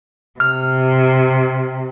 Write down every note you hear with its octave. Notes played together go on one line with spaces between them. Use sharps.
C3 F6